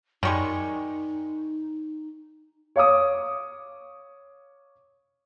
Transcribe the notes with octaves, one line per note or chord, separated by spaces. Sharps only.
F#2 D#3 G3 G#3 D#4 C#6
C#5 F5 D6 D#6